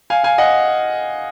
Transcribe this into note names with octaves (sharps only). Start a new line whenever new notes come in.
F5 G#5
F5 G#5
D#5 F#5